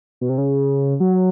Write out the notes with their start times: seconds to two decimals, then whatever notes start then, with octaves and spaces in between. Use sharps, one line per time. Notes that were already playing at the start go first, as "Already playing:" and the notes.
0.21 B2
0.29 C3
0.38 C#3
1.00 F#3